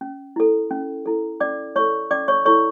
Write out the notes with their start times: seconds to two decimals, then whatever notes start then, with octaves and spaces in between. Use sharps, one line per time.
0.01 C#4
0.36 E4 A4
0.71 C#4
1.06 E4 A4
1.40 C#4 D5 D6
1.76 E4 A4 C#5 C#6
2.11 C#4 D5 D6
2.28 C#5 C#6
2.45 E4 A4 C#5 C#6